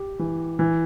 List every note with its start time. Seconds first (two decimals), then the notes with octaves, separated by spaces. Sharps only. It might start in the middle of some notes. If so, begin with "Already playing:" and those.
Already playing: G4
0.19 E3
0.59 E3